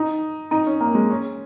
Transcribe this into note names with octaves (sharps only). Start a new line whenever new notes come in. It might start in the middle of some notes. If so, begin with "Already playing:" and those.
Already playing: D#4
D#4
C#4
A#3
G#3
C#4